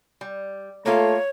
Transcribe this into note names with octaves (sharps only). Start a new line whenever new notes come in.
G3
A3 A#3 F4 A4 C#5